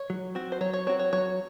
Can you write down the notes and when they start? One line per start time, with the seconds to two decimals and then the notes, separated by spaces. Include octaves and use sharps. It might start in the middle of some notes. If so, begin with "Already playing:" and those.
Already playing: C#5
0.10 F#3
0.35 C4 F#4
0.52 C5
0.61 F#3 C#5
0.73 C#5
0.87 C4 F#4 C#5
0.99 C#5
1.13 F#3 C#5